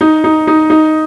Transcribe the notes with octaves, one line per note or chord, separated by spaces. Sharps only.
D#4
D#4
D#4
D#4